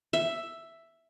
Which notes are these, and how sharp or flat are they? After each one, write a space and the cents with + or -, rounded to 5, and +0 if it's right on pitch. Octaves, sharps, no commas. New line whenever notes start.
E5 +5